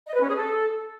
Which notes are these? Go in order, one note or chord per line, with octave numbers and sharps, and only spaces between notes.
D#5
B4
C#4
G#4
A4